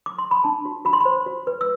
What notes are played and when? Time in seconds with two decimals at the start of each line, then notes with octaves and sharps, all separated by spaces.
0.06 D6
0.18 C6
0.31 B5
0.44 D4 A5
0.65 F#4
0.85 F#4 B5
0.93 C6
1.01 C5 B5
1.26 F#4
1.47 B4
1.61 E6